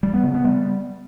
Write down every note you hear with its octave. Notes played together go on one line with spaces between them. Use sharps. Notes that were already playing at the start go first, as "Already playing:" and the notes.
G3
B3
C#3
B3
G3